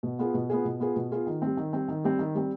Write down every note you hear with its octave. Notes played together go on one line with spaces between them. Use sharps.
B2
B3 F4 G#4
B2
B3 F4 G#4
B2
B3 F4 G#4
B2
B3 F4 G#4
D#3
G3 C4
D#3
G3 C4
D#3
G3 C4
D#3
G3 C4